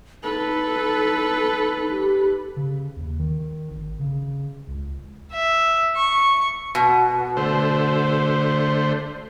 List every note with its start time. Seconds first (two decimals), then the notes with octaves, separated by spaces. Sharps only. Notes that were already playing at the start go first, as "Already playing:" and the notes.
0.23 D#4 A4 B4
1.91 G4
2.56 C#3
2.96 D#2
3.19 D#3
3.71 G#1
3.99 C#3
4.68 C#2
5.32 E5
5.97 C#6
6.75 B2
7.37 D3 A3 C5